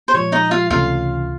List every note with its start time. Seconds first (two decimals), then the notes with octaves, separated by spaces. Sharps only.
0.08 C5
0.14 A#2 F3 G#3 C#5
0.32 D#4 D#5
0.51 F4 F5
0.70 C#2 C3 E3 A3 C#4 F4 F5